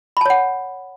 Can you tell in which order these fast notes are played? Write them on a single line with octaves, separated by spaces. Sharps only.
B5 A5 C#5 F#5